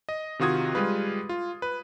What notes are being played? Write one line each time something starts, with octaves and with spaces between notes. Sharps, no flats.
D#5
C3 D#3 F4 F#4 D#6 G#6
G3 G#3 F4 B4
F4
B4